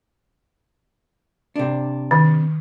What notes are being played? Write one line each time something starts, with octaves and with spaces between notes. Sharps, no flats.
C3 D4
D#3